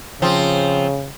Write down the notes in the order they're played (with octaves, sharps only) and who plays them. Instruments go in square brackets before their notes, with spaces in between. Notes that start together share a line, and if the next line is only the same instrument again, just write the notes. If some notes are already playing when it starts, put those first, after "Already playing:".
[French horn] C#3 [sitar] F3 C4